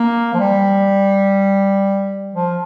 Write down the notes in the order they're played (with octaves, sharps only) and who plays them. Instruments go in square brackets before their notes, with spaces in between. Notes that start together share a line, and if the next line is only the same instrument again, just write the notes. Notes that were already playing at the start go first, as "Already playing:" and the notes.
Already playing: [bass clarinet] A#3
F3
G3
F3